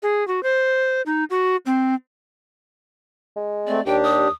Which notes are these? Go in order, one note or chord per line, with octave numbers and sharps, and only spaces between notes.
G#4
F#4
C5
D#4
F#4
C4
G#3
A3 C4 D5
D#2 D4 G4 G5
D#6